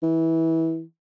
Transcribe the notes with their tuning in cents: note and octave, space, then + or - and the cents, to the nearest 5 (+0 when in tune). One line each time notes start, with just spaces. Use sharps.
E3 -20